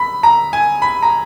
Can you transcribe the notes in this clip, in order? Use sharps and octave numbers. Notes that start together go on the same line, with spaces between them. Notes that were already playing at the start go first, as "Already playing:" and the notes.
Already playing: B5
A#5
G#5
B5
A#5